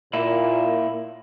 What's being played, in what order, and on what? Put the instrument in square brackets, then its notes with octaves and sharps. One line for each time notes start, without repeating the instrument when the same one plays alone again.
[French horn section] A#2 [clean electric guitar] A#3 E4